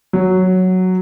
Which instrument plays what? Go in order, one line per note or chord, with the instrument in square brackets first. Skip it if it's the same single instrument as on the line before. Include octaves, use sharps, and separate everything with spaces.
[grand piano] F#3